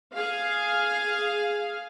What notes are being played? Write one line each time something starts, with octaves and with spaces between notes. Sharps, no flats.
G#4 F5